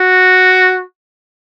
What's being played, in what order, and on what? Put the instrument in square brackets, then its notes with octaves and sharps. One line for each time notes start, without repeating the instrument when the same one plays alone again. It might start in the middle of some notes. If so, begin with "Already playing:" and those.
Already playing: [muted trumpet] F#4